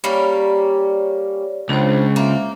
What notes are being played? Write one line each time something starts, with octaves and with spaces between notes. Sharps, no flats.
G3 A#3 C#4 C#5 D5
C#2 D4 C5
A#3 E5